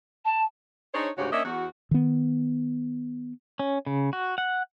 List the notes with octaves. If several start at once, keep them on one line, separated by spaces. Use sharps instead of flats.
A5
D4 D#4 G#4 C5 C#5
D2 G#2 C#3 F#4 G4 C#5
A#3 C#4 D4 D#5 E5
E2 F#4
D#3 B3
C#4
C#3
F#4
F#5